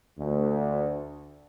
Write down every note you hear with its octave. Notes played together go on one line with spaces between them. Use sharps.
D2